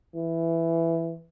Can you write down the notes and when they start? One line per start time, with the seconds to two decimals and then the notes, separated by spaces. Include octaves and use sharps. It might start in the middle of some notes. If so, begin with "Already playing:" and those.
0.15 E3